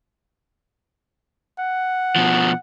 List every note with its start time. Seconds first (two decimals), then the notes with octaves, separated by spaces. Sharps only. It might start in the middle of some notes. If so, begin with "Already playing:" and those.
1.59 F#5
2.16 B2 F3